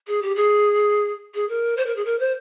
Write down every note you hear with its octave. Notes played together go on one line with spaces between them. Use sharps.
G#4
G4
G#4
G#4
A#4
C5
A#4
G#4
A#4
C5